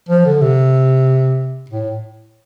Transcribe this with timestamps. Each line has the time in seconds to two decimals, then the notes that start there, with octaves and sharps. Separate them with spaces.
0.09 F3
0.26 D3
0.41 C3
1.70 A2